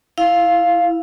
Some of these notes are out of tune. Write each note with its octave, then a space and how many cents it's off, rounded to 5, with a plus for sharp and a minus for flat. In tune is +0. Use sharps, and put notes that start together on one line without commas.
E4 +0 F5 +0